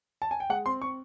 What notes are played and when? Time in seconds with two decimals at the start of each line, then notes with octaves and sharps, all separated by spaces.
0.22 A5
0.31 G#5
0.40 G5
0.49 G#3 F#5
0.66 C4 C6
0.82 C4 C#6